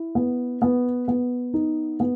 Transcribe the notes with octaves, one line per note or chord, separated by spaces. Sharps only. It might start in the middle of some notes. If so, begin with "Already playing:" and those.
Already playing: E4
B3
B3
B3
D#4
B3